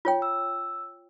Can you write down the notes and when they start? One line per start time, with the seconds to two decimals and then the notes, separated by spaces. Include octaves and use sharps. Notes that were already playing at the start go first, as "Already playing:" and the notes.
0.05 F4 C#5 G5
0.22 E6